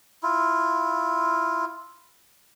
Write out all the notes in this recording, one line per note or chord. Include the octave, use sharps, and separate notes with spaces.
E4 F4